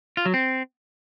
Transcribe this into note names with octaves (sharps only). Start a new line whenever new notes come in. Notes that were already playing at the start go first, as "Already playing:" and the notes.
F4
F#3
C4